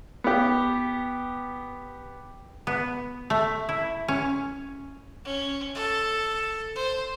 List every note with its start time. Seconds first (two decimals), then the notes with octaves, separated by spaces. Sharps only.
0.24 B3 G4
2.67 B3
3.30 A3
3.69 E4
4.08 C#4
5.25 C#4
5.75 A4
6.75 C5